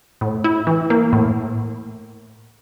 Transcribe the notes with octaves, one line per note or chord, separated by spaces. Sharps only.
A2
E4
E3
A#3
A2